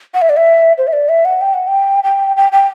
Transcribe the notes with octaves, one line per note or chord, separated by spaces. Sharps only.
F#5
E5
D5
E5
C5
E5
D5
E5
F#5
G5
F#5
G5
G5
G5
G5